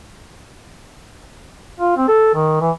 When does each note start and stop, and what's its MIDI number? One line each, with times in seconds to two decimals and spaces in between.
1.80 1.96 65
1.97 2.07 60
2.08 2.33 69
2.35 2.56 51
2.61 2.71 52